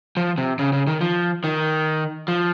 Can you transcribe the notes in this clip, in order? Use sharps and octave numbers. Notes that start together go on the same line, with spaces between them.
F3
C3
C#3
C#3
D#3
F3
D#3
F3